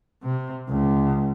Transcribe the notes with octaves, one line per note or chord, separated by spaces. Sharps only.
C3
C#2